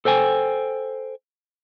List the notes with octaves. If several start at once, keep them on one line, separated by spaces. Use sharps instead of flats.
A4 C5 G5 G#5